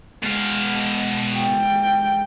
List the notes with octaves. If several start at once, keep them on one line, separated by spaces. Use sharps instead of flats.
B2 G#3 F5
G5